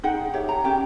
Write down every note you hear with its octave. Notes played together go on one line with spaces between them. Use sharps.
D#4 G#4 F#5 G5
G4 C#5 E5
A#5
C#4 G4 G5